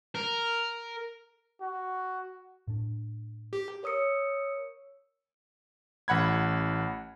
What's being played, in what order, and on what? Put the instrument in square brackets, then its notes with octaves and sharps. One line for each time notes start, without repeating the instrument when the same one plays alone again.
[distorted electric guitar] A#4
[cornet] F#4
[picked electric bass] A2 D4
[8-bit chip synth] G4
[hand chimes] A#4 C#5 D#6 E6 C#7
[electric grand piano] A1 F#5 B5 G#6